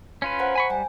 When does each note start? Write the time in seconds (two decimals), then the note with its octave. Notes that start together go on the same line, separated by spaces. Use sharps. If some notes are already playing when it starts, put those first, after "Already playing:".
0.22 C#4 F4 B4
0.39 C5 F#5 A#5
0.55 G#5 B5 C#6
0.70 G3 G5 G#5